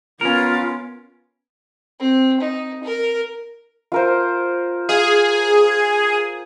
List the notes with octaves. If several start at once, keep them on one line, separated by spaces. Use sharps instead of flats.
B3 C#4 F4 A#4
C4
D#4
A#4
F4 A#4 C5
G#4 F5